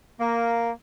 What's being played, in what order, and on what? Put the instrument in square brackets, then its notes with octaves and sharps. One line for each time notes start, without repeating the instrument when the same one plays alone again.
[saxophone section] A#3